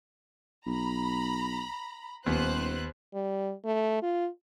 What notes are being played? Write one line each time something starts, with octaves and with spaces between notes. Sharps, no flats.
B1 A#5 B5
D#1 D#2 B3 B4 C5 F#6
G3
A3
F4